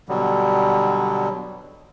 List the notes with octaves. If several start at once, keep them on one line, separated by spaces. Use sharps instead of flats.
B2 D3 F#3 G3